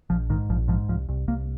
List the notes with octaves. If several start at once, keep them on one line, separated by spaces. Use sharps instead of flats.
A#1 F3
G#2 D#3
A#1 F3
G#2 F3
C2 F3
C2
C2 A#3